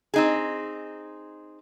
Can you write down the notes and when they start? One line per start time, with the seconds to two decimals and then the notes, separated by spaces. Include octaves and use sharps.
0.14 C4 D#4 G#4